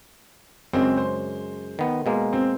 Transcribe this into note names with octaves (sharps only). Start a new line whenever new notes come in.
F#2 C#3 G#3 C4
C5
D#3 B3
B2 G#3 A#3
C4